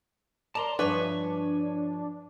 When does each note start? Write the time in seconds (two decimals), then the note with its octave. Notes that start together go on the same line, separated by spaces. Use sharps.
0.55 A#4 D5 A5 A#5 C6
0.79 G2 F3 D4 B4 C#5 E5 G#5 C#6